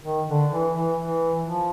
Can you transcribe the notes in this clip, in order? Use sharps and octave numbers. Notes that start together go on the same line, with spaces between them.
D#3
D3
E3
E3
E3
F3